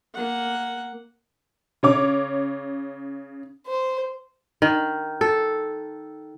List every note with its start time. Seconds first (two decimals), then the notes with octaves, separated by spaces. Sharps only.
0.14 A#3 F#5
1.83 C#3 C#5 D6
3.66 C5
4.62 D#3
5.21 A4